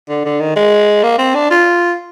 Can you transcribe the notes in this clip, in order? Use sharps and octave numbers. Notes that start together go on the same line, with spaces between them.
D3
D3
D#3
G#3
A#3
C4
D4
F4